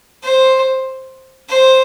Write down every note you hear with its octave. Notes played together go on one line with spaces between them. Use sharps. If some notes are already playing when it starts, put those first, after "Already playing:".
C5
C5